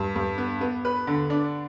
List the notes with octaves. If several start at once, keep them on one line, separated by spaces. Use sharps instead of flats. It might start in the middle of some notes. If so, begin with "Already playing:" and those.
Already playing: G2
G2
B3
B3
B4
D3
D4